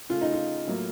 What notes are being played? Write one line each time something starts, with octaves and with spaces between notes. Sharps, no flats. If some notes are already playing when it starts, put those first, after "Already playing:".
C#3 A3 F4
D#4
F4
A2 F#3 A#3